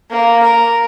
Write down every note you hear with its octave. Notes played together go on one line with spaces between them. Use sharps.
A#3
A#4